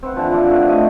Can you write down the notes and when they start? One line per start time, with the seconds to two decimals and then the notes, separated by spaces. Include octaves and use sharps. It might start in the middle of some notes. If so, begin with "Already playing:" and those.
0.03 C4 B4 F#5
0.16 D3 E3 F3
0.32 F4 D5 F#5
0.47 D3 A3
0.69 C3 A3 D#5 G5